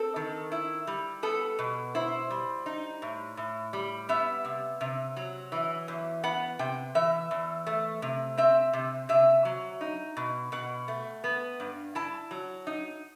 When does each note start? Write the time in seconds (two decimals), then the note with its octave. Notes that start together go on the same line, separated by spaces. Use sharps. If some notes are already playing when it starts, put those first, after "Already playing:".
Already playing: C4 A4
0.16 D#3
0.52 E4
0.87 G3
1.23 B3 A4
1.59 B2
1.95 E4 C5
2.30 G3
2.66 D#4
3.02 A2
3.37 A2
3.73 G3
4.09 B3 E5
4.45 C3
4.81 C3
5.17 F#3
5.52 E3
5.88 E2
6.23 B3 F#5
6.59 C3 G5
6.95 E3 E5
7.31 E2
7.67 A3
8.02 C3
8.37 C4 E5
8.73 C3
9.09 C3 E5
9.45 F#3
9.81 D#4
10.17 B2
10.52 B2 F#5
10.88 A3
11.24 B3
11.60 G2
11.95 E4 A5
12.31 F#3
12.67 D#4